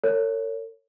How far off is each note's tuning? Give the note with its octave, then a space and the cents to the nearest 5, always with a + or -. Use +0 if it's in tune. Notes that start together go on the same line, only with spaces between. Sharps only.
A#4 -45 C#5 +5